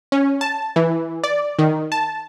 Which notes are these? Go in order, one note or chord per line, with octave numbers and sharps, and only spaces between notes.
C#4
A5
E3
D5
D#3
A5